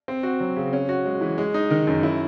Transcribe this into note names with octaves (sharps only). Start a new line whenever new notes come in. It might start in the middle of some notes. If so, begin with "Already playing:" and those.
C4
F#4
F#3
C#3
C#4
F#4
G#3
E3
G#3
D#4
D#3
F#2
E4